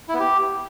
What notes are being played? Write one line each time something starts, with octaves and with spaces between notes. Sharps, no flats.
E4
B3
G4